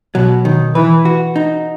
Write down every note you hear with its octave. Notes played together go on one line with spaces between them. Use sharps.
B2 F#3
D#3
E3 B4
F#4
D#4